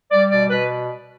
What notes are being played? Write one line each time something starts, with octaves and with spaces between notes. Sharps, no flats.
G3 D5
B2 D5
B2 B4